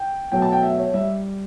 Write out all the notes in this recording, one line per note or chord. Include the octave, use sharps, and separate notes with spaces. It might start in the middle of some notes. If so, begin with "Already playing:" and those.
Already playing: G5
B2 F#3 A3 G5
A5
G5
E5
C#5
G3 E5